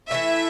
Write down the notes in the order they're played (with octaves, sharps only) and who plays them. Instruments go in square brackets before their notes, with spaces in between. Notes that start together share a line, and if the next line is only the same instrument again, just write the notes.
[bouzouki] E3 A3 E4 [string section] E5